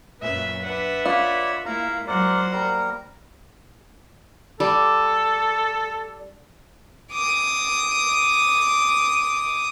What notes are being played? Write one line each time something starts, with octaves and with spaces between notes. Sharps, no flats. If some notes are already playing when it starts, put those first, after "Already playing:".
F#2 A#2 C#4 B4 E5
D4 B4 E5 F#5
F4 C#5 D5 B5
G#3 A#3 E4 F5 A#5
F#3 A#4 C5 D5 F#5
G3 A#3 A#4 A#5
G3 A4
D6 D#6